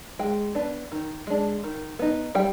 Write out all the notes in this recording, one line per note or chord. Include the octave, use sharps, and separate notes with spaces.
G#3 G5
B3 D4
D#3
G#3 D4
D#3
B3 D#4
G3 G5